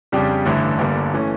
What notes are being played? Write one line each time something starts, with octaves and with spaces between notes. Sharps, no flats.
F2 C#3 G3 D4 G4
A1 G2 D3 A3 E4
G1 G2 D3 G3 A#3
E3 A3 C#4